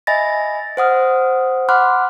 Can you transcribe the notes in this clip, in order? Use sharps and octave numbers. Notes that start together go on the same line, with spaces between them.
D#5 E5 G#5 B5 A6 A#6
C5 F#5 D#6 F6
F#5 B5 C6 D6 F6 F#6